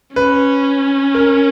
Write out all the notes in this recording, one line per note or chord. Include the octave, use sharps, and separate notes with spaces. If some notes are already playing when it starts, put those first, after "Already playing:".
C#4 B4
A#4